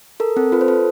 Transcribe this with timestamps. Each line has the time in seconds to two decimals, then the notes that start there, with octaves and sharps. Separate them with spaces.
0.20 A4 A#4
0.36 C4 A4
0.52 F4 B4
0.61 C5
0.68 A4 B4